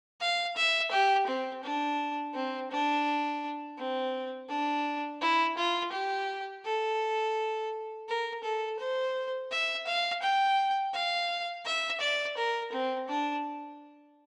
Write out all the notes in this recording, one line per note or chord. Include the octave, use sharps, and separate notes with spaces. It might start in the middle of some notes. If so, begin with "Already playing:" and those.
F5
E5
G4
C4
D4
C4
D4
C4
D4
E4
F4
G4
A4
A#4
A4
C5
E5
F5
G5
F5
E5
D5
A#4
C4
D4